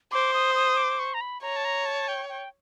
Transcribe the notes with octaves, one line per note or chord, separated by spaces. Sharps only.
C5 D6
D#6
D#6
D6
C#6
A#5
B5
C#5 A#5
A5
A#5
A5
G5
G5